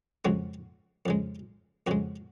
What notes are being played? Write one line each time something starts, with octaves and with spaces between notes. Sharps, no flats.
F2 C#3 G#3 F#4
F2 C#3 G#3
F2 C#3 G#3 F#4